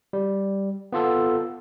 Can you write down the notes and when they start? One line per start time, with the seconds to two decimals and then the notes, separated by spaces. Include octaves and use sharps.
0.13 G3
0.92 B3 F4 A4